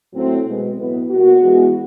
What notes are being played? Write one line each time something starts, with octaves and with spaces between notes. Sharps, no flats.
A2 F#3 A3 C4
B2 G#3 B3
A2 F#3 B3
B2 G3 A#3 F#4
E3 G#3 B3